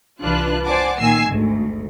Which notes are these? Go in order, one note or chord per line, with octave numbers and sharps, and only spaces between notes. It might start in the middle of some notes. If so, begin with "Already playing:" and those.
C2 E3 D4 F4 B4 F#6
C5 D5 F#5 G#5 A5 D6
A#2 D#3 G#5 E6 C7
G#1 D2 G#2